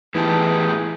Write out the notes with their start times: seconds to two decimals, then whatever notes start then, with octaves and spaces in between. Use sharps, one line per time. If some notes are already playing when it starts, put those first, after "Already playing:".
0.15 A2 E3 B3 D#4 G4 G#4 A5 G6